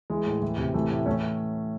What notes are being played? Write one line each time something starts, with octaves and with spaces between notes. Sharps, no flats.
E3 G#3
A2
E3
C3
E3 A3
A2
E3 A3 C#4